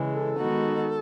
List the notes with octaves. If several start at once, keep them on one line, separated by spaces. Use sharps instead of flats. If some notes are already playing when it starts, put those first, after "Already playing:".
Already playing: C#3 E3 G#3
A4
D#3 G#3 B3 D#4 F#4